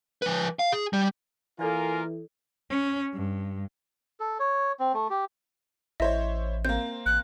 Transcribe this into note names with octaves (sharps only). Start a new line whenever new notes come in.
F3 B4
F5
G#4
G3
E3 A#3 F4 A4 A#4 D5 E5 G#5
C#4
G2
A4
C#5
C4
A3
G4
A1 E4 C5 C#5 D#5 E5
A#3 C4 G6
A1 F#6